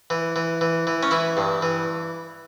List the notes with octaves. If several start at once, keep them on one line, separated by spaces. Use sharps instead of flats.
E3
E3
E3
E3
C#4
E3 E4
G2
E3